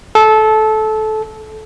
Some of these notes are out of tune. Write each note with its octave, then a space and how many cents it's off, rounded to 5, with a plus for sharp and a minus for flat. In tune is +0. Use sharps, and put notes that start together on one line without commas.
A4 -20